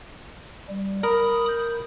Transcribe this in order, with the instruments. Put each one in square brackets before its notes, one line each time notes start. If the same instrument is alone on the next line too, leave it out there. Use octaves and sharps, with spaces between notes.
[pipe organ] G3
[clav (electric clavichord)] A#4 [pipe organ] B5 D#6
[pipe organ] G6